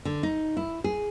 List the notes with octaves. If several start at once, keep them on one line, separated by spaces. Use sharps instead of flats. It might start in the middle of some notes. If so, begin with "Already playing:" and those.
D3
D#4
E4
G#4